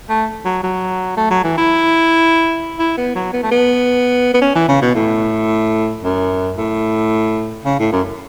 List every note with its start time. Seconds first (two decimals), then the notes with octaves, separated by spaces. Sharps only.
0.09 A3
0.45 F#3
0.63 F#3
1.17 A3
1.31 F#3
1.44 E3
1.58 E4
2.79 E4
2.97 B3
3.15 F#3
3.33 B3
3.43 A3
3.52 B3
4.34 B3
4.41 C#4
4.55 E3
4.69 C#3
4.82 B2
4.95 A2
6.03 F#2
6.57 A2
7.65 C#3
7.79 A2
7.92 F#2